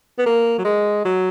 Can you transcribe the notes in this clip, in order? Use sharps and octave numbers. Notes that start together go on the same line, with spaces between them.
B3
A#3
F#3
G#3
F#3